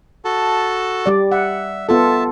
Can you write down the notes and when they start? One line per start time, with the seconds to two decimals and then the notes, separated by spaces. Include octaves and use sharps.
0.25 F#4 A4 A5
1.06 G3 D5
1.32 E5 F#5
1.89 B3 F4 A4 E5 A5